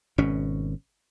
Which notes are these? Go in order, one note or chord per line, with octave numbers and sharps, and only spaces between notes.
G#1 B2 C#4